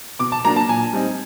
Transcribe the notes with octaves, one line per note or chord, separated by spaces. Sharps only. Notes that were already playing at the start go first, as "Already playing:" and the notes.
B2 D6
A5
F#3 A#3 D4 A#5
A5
A#2 G#5
G3 C4 D#4